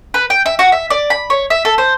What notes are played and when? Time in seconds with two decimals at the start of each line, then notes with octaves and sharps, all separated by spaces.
0.14 B4
0.30 G5
0.46 E5
0.59 F#4
0.72 E5
0.90 D5
1.10 B5
1.30 C#5
1.50 E5
1.65 A4
1.78 C5